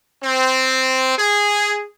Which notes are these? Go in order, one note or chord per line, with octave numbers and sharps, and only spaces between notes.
C4
G#4